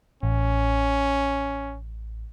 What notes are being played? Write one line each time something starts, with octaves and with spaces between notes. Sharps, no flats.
A1 C#4